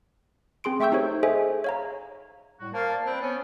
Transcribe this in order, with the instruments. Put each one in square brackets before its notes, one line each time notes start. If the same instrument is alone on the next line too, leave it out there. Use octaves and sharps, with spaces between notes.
[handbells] C4 G#4 C6 D7
A3 E5 G5 C#6 E6 G6
D#4 G4 A4 C5 C#5
G#4 A4 C5 D#5 E5 G#5
C#5 F5 A#5
[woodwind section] A2 G3 F#4
[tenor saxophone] A#3 [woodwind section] C5 F5 A5
[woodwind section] D5 A5
[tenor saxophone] C4 [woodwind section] B4
[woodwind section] B3 [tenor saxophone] C#4